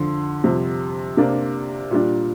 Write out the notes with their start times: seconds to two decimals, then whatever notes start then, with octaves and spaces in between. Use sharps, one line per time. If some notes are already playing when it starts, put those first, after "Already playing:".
Already playing: F2 D3 F3 C6
0.44 F2 C3 G3
1.17 C3 A#3 D4
1.91 A#2 G3 D4